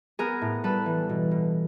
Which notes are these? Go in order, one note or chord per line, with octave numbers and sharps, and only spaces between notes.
B3 G#4 A#4
A2
G3 A4 B4
E3
B2
B2